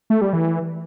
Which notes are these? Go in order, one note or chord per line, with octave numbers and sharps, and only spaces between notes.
A3
G3
E3